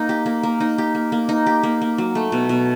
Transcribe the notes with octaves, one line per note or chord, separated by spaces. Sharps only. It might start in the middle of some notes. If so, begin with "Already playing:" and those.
Already playing: A#3 D#4
G4
A#3
A#3
D#4
G4
A#3
A#3
D#4
G4
A#3
A#3
F#3
A3
B2
B2